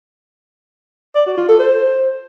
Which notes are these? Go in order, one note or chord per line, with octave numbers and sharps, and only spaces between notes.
D5
F#4
F4
A4
C5